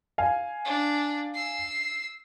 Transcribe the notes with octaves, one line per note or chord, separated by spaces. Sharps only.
F5 G#5
D4
E6 C7